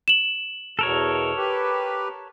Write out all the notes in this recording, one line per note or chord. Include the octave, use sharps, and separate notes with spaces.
E7 F#7
E2 B2 A4 A#4 C#5
G4 B4